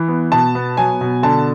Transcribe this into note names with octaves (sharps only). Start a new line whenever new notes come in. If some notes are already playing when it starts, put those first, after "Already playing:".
Already playing: E3
B3
B2 A5
B3
F#3 G#5
B2
D3 A5